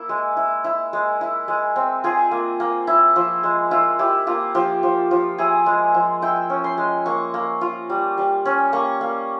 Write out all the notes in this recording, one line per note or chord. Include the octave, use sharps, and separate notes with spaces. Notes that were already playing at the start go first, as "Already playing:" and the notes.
Already playing: A#3 E4
G#3
E4
E4
G#3
E4
G#3
C4
F4 G#4
A#3
A#3
E4
F3
G#3
E4 F4
E4 G4
A#3 F4
F3 G4
F3
F3
E4 G#4
G#3
F3
E4 G5
C#4
C6
G#3
A#3 C#6
A#3
F4
G3
G3
C#4
A#3 C#6
A#3